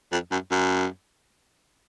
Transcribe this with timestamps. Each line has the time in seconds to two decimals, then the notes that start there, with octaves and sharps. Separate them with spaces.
0.12 F2
0.31 F#2
0.51 F#2